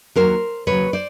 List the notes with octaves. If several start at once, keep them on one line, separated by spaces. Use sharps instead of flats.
D#2 C#3 F#3 A#4 C5
D#2 C#3 F#3 B4 C#5
C5 D5